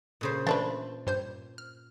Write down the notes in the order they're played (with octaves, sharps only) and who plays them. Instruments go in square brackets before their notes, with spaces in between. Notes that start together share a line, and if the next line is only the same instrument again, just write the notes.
[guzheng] A#2 C#3 C5
[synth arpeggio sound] E3 A6 [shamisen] A3 D4 B4 [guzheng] C6
[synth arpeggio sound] G2 C5 G6
F6